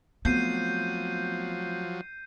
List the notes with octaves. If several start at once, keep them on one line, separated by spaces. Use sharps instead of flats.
F3 F#3 A3 B3 C4 G6 C7 D#7